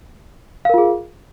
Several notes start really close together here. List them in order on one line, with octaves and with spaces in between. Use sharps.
F5 A#4 F4 G#4